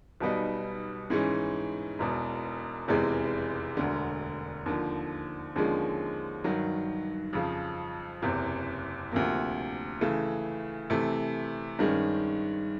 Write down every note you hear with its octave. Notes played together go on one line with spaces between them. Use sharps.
B1 B2 G3 B3 D#4
G#2 E3 G#3 C#4
E1 E2 B2
F1 E2 C3 E3 G#3
E1 D2 D3
D#2 D3 F3
D#2 D3 F3 G#3 C#4
G2 D#3 F#3
F2 C#3 F3
F#1 E2 C3
D2 C3 F3 A#3
C#3 E3 A3
C3 E3 A3
G2 D#3 G#3 C#4